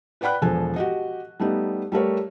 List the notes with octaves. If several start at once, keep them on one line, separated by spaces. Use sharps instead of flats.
B4 D5 F#5 G5 B5 F#6
E1 F3 A4 G#5
F#4 G4 D#5
G3 A3 B3 D#4
G3 A3 A#4 C#5